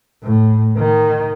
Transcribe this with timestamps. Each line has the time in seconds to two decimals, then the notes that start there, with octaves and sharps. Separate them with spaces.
0.23 A2
0.77 D#3